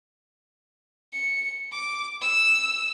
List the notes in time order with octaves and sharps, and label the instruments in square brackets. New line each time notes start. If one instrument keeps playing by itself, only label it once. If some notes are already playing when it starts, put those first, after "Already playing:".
[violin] C#7
D6
E6